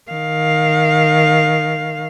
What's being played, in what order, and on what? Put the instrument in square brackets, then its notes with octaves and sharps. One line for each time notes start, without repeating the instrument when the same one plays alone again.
[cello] D#3 F5